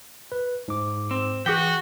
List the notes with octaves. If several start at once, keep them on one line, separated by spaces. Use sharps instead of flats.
B4
G#2 D6
C4
E3 F#4 G#4 G5 D6 B6